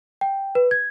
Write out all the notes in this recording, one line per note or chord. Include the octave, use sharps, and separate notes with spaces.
G5
B4
G#6